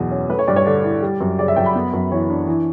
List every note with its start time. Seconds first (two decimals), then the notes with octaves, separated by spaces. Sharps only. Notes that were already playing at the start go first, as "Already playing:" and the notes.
Already playing: E2 B2 F#3
0.11 C#4
0.29 A3 B4
0.39 C#5
0.47 G2 D5
0.56 C#5
0.66 D3 D5
0.84 E4
1.03 G3
1.20 F#2
1.38 C#3 D5
1.48 E5
1.56 F#2 G5
1.66 B5
1.75 B3
1.93 F#2
2.11 E3 C#5
2.30 D4
2.48 E3